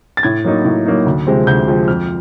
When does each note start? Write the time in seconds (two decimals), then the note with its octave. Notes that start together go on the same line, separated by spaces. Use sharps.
0.17 A6
0.23 A2 G#6
0.45 F#3 A#3 D#4
0.65 A2
0.86 F#3 A#3 D#4
1.06 D2
1.27 C3 F3 G#3 C4
1.47 D2 G6
1.68 C3 F3 G#3 C4
1.88 F2 F6